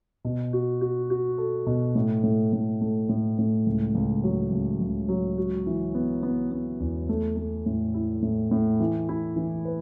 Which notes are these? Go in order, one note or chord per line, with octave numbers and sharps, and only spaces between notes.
B2
F#4
F#4
F#4
A4
B2
A2
A2
A2
A3
A2
A2
C#2
C#2
F#3
C#2
C#2
F#3
F#4
E3
B3
B3
B3
E2
A3
A3
A2
E4
A2
A2
E3
E4
E3
B4